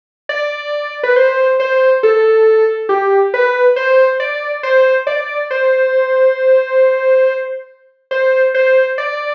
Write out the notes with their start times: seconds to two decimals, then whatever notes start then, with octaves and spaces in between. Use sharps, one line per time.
0.29 D5
1.03 B4
1.16 C5
1.60 C5
2.03 A4
2.89 G4
3.34 B4
3.76 C5
4.20 D5
4.63 C5
5.07 D5
5.51 C5
8.11 C5
8.54 C5
8.98 D5